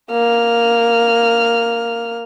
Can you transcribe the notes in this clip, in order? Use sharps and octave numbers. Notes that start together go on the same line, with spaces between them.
A#3 F6